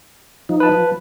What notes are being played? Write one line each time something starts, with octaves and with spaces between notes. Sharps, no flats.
F3 D#4
B4 A5
F3